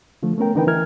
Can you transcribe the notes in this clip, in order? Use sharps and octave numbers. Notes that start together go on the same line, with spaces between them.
D3 F3 A3
A3 B3 C#4 A#4 G5
D3 E3 D#4 A#4 B4 G5
E3 A#4 F6 G#6